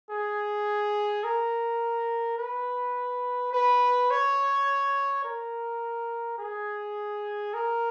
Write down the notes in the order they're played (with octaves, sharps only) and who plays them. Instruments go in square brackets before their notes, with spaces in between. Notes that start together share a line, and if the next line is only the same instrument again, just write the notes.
[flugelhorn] G#4
A#4
B4
B4
C#5
A#4
G#4
A#4